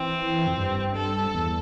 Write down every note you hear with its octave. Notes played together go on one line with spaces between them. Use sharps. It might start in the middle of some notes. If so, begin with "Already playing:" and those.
Already playing: E3 C4
F2
G2
A4
E2